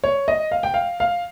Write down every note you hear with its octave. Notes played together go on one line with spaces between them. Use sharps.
C#5
D#5
F5
G5
F5
F5